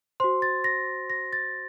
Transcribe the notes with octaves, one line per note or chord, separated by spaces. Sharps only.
F#4 C5 C6
A6
A#6
A#6
A6